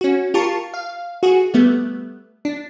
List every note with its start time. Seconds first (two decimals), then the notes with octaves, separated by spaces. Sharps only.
0.01 C#4 F#4
0.34 F4 G4 A#4 A5 C#6
0.74 F5
1.23 F#4 G#4
1.54 G3 A3 B3
2.45 D4